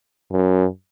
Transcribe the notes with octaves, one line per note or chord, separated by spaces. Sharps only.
F#2